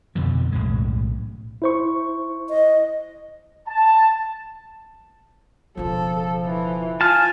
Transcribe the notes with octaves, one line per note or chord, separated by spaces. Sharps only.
F2 B2 D3 F3
B1 A2 G#3
E4 C5 C#6
D#5
A5
E1 C#3 F3 A4
E3
F4 G#5 A5 F6